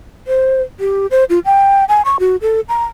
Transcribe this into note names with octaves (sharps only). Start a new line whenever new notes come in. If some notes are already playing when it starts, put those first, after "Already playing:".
C5
G4
C5
F4
G5
G#5
C#6
F#4
A4
A#5